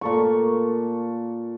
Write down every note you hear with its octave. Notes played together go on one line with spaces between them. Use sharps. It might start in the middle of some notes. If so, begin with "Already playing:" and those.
A#2 A4 C#6